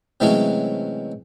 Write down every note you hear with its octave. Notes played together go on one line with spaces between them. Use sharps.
C3 E3 F#3 G#3 A3 C#4